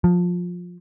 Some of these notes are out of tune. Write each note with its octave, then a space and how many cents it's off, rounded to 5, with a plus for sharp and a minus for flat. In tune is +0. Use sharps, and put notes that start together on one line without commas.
F3 +20